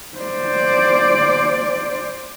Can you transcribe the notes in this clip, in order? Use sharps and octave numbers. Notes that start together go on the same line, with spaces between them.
C5 D5